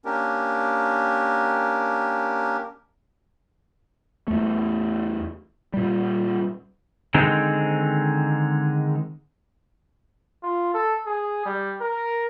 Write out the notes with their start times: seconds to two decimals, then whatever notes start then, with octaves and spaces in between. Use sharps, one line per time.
0.05 A#3 C#4 D4 G4 A#4
4.28 E2 A3
5.74 A#2 G3
7.14 D3 D#3 G#3 C4 D#4
10.43 F4
10.74 A4
11.06 G#4
11.45 G3
11.81 A#4